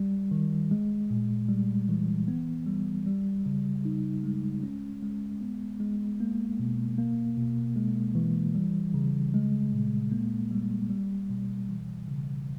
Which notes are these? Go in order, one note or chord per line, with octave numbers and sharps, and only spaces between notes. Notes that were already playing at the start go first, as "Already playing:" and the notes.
Already playing: G3
D#3
G#3
A#2
G3
E3
B3
G3
G3
C#3
D#4
G#3
C#4
G#3
B3
G#3
A#3
B2
A#3
B2
G#3
E3
G3
C#3
G#3
A#2
A#3
G3
G3
B2
E3
C#3